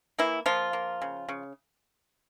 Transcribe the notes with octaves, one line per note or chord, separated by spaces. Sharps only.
E3 A#3 E4
F3 A#3 F4
A#3
C#3
C#3